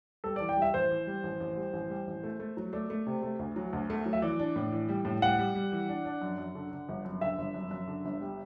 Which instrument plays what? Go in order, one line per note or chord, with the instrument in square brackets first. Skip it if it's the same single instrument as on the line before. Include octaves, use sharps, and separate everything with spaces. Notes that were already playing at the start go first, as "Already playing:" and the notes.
[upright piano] G3 [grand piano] A4
[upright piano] E3 [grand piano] D5
[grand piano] G5
[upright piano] G3 [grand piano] E5
[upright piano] A1 [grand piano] C5
[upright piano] E3
G3
A1
A1
G3
A1
G3
A1
A3
A3
F#3
[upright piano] A3 [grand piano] D5
[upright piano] A3
C3
A3
D2
F#3
D2
A3
F#3
[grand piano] E5
[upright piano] E3 [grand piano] D5
[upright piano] D4
A2
E3
G3
A2
[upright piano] G3 [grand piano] F#5
[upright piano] G3
G3
E3
D4
D4
F#2
F#2
D3
D3
G1
F#2
[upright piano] D3 [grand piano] E5
[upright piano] G1
F#2
F#2
D3
G1
G3